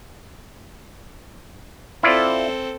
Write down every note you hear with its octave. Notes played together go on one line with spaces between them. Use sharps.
C4 E4 F4 A4 D5